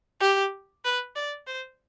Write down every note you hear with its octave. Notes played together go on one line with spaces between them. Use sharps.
G4
B4
D5
C5